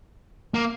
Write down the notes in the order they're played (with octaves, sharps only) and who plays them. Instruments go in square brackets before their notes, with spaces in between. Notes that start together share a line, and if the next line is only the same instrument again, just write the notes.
[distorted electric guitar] A#3